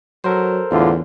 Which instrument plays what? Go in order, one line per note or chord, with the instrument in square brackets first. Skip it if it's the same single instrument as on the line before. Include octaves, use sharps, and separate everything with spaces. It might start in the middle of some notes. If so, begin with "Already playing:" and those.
[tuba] F#3 [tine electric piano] A4 A#4 C5
[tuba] E2 [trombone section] A2 D3 F4